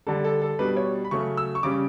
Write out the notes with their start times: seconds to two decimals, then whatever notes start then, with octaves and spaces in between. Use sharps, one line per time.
0.07 D3 G3 D4 A4
0.24 A4
0.42 A4
0.59 B2 G3 D4 B4
0.77 C#5
1.04 B5
1.11 C#3 F#3 A3 C#4 C#6
1.37 E6
1.55 C#6
1.63 C#3 G3 C#4 D6